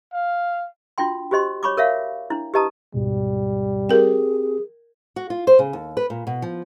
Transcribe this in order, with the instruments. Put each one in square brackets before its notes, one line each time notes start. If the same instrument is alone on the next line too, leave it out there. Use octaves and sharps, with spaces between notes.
[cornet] F5
[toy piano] D4 F4 F#4 G5 C6
F#4 G4 C5 D#5 C6
C#5 B5 C#6 D6
A#4 C#5 E5 F5
D4 E4
G4 B4 D#5 A5 A#5 D#6
[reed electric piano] D2 G#2 B2 [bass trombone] G3
[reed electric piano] C4 G4 [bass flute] G#4 [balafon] A#4 G5
[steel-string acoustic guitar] F#4
F4
C5
C#3
D#2
B4
A#2
B2
F3